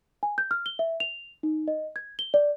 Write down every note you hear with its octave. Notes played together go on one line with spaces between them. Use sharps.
G#5
G6
F6
G7
E5
F7
D#4
D#5
G#6
G7
D5